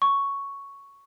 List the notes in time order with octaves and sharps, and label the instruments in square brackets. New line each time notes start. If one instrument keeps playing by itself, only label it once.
[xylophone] C#6